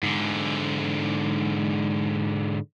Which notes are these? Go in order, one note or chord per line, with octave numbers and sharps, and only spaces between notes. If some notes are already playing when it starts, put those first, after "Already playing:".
G#2 D3